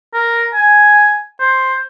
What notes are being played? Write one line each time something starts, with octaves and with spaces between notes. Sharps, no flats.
A#4
G#5
C5